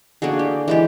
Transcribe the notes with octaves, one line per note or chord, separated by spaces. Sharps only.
D3 A#3 F#4 G#4
G4
E3 G#3 G4